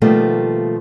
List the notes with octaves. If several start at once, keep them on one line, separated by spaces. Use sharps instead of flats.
B2 D#3 F3 G3 A3 A#3